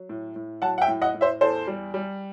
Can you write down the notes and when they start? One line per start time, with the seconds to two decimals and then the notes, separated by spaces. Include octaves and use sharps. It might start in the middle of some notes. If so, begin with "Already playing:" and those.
Already playing: F#3
0.09 A2
0.36 A2
0.62 F#3 F#5 A5
0.78 F#5
0.81 E5 G5
0.88 A2
1.02 D#5 F#5
1.15 A2
1.21 C5 E5
1.41 E2 A4 C5
1.67 G3
1.94 G3